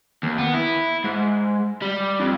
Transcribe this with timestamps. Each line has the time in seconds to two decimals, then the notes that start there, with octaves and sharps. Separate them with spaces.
0.23 D#2
0.38 B3
0.54 E4
1.04 G#2
1.82 G3
2.20 F2